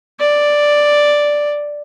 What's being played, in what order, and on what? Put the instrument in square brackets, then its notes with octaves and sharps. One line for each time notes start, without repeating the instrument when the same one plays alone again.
[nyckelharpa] D5